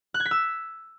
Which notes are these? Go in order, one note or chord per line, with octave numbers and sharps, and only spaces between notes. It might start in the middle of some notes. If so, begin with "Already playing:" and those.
F#6
G#6
B6
E6